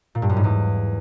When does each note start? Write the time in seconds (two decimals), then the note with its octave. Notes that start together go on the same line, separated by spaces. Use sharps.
0.15 A#2
0.22 G2
0.29 F#2
0.37 G#2
0.44 E2